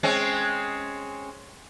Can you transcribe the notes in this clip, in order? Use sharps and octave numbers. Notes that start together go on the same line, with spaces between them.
G#3 C4 C#4